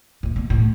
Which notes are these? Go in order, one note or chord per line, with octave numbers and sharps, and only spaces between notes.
A2
B2
A2